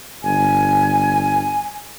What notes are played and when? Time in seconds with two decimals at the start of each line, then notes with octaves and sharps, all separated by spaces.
0.23 G1 G#5